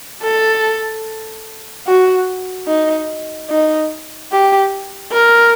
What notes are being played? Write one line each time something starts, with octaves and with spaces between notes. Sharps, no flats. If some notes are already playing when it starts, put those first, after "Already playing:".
A4
F#4
D#4
D#4
G4
A#4